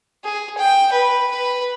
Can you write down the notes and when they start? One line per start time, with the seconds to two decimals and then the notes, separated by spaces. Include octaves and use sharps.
0.24 G#4
0.57 G5
0.92 B4
1.31 B4